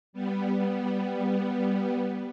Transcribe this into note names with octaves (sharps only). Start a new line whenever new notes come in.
G3 B3